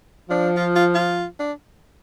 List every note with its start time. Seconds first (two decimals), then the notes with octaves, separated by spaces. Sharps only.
0.29 F3 D4
0.56 F4
0.76 F4
0.94 F4
1.39 D4